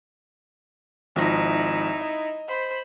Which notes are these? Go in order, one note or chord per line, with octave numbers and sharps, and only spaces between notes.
G#1 F3 D#4 E4 A#6
D#5
C5 B5